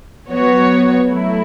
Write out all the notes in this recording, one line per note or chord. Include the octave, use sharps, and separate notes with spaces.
F#3 B3 F#4 C#5
F#3 A3 E4